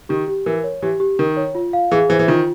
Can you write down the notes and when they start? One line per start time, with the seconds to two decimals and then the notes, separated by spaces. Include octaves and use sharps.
0.09 D#3 G4
0.28 G4
0.46 E3 A#4
0.64 C#5
0.82 E3 G4
1.00 G4
1.19 D#3 A#4
1.37 C#5
1.55 F4
1.73 F5
1.91 E3 G#4
2.09 E3 C5
2.19 E3
2.28 D#3 F4